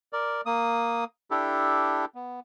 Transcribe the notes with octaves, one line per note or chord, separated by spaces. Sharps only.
A#4 D5
A#3 D#6
D4 E4 G4 A4
B3